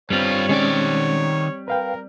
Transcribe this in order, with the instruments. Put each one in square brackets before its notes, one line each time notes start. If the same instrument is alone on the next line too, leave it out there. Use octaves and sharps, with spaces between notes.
[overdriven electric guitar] G2 F4 [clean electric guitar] G3 C4 [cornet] C#5
[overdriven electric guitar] D#3 D5 [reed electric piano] G#3 C#4
[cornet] A#4 [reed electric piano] B4 F5 G5